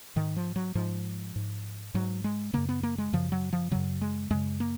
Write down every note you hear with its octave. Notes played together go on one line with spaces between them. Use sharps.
G#2 D#3
F3
F#3
G#2 F3
G#2
G#2 F#3
G#3
F#2 C#3 A#3
B3
A#3
G#3
F#2 C#3 F3
F#3
F3
F#2 C#3 F#3
G#3
F#2 C#3 G#3
A#3